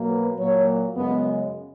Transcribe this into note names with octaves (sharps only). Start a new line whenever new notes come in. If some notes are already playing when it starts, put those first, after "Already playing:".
Already playing: B2 F#3 A#3
B4
A#2 F#3 A#3 C#5
F#2 C#3 G#3 B3